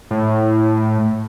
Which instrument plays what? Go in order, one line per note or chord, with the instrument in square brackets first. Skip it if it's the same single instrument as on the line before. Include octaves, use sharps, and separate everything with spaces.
[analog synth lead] A2